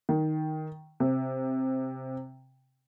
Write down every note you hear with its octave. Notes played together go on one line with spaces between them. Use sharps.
D#3
C3